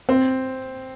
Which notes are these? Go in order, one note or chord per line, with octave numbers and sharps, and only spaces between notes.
C4